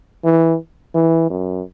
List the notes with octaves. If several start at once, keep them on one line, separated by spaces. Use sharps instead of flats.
E3
E3
F#2